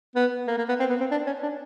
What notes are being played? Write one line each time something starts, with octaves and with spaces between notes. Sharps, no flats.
B3
A#3
A#3
B3
C4
B3
C4
D4
C#4
D4